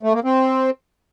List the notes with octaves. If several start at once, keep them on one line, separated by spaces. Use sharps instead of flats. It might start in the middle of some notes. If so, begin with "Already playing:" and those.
A3
A#3
C4